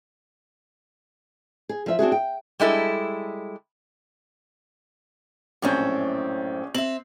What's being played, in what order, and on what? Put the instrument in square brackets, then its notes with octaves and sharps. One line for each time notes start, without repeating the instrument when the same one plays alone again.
[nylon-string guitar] G#4
F3 E5
C4 D4 F#4 G#4
G5
[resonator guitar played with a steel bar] G3 G#3 E4 A4
[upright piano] A#1 C#4 G6 [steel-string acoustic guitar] F#2 A2 C4
[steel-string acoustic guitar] C4 E5 [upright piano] F#7